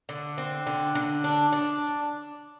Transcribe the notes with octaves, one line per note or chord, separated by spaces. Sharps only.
D3
C4
D3
D3
D4
D4